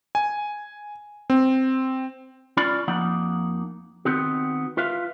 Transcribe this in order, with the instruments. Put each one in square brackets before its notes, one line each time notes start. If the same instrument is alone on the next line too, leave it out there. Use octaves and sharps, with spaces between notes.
[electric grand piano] G#5
C4
[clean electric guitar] C#4 F4 D5 B5
F2 F3 A#3 D#4 F#5
D#3 B3 C4 D#4 F#4
F4 B4 E5 F5